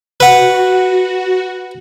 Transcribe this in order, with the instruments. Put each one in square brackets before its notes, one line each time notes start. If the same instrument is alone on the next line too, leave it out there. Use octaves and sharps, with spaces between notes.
[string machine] F#4 [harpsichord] B4 F#5